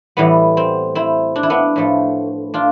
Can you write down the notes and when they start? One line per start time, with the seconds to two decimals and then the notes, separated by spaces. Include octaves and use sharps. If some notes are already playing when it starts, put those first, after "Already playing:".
0.17 A2 E3 G3 B3
0.57 C4
0.95 C4 E4
1.36 D4
1.43 E4
1.50 B3 D4
1.76 A2 F3 A3
2.54 D4 F4